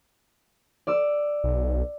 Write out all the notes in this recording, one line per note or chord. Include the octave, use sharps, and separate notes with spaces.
D5 E6
B1